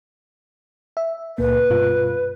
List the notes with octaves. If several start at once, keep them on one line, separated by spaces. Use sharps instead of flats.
E5
C#2 A#2 A#3 B4
G2 B2 F4